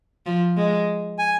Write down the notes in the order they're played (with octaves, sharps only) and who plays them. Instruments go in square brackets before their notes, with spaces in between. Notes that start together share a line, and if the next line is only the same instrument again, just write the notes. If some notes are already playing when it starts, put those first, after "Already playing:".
[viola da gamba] F3
G#3
[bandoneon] G#5